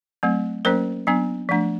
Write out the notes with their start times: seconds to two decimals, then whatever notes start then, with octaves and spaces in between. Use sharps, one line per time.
0.23 F#3 A3 C4
0.65 F#3 A#3 C#4 A#4 C5
1.07 F#3 B3 D4
1.49 F3 A3 D4